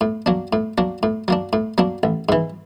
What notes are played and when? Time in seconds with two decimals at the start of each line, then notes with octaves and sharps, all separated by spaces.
0.01 A2
0.26 F#3 A#3 D4
0.53 A2
0.78 F#3 A#3 D4
1.03 A2
1.28 F#3 A#3 D4
1.53 A2
1.78 F#3 A#3 D4
2.03 A1
2.29 G#2 E3